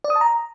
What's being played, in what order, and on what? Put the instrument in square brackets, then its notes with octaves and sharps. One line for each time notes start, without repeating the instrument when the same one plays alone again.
[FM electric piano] D5
D#6
A5
A#5